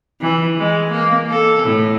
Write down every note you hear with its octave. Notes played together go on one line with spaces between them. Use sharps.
E3
G#3
A#3
A4
A2